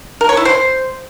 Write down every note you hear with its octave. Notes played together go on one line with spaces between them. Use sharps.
A#4
C#5
E4
C5